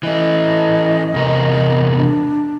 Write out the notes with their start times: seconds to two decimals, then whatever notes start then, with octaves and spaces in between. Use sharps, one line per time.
0.03 E3 A3 D#5
1.14 E2 C3 A#4
1.52 D#5
1.94 D4